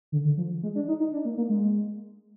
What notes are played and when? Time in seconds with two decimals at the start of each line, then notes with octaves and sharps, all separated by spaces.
0.12 D3
0.25 D3
0.38 F3
0.63 G#3
0.75 D4
0.88 D#4
1.00 D#4
1.13 D4
1.25 A#3
1.38 A#3
1.49 G#3